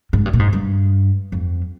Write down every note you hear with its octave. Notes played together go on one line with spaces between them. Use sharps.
G#2
G2
A#2
G#2
G2
F2